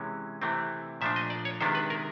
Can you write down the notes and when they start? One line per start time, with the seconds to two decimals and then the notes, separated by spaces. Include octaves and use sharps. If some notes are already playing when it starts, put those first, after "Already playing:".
Already playing: C3 E3 G#3 C#4
0.42 C3 E3 A3 C4
1.01 A#2 F3 A3 D4 E5
1.16 D#5
1.30 D5
1.45 C#5
1.61 C3 D#3 G#3 B3 D4 C5
1.75 B4
1.90 A#4